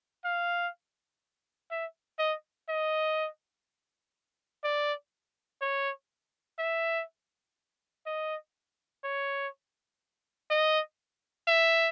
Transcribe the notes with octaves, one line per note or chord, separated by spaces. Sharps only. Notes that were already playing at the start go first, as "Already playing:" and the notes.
F5
E5
D#5
D#5
D5
C#5
E5
D#5
C#5
D#5
E5